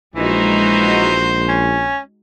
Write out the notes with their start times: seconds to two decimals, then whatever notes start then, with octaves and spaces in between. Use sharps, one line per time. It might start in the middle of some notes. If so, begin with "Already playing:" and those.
0.16 A#1 E3 G#3 D#4 F#4 C5
1.49 C#4